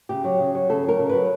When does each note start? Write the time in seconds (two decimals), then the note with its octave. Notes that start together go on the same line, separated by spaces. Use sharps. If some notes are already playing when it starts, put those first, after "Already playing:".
0.09 C#3 G4
0.24 F#3
0.39 C#3
0.55 F#3
0.69 C#3 A4
0.83 F#3 A#4
0.99 C#3
1.09 F#3 B4